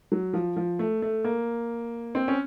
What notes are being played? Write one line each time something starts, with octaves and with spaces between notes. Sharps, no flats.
F#3
F3
F3
A3
A3
A#3
C4
C#4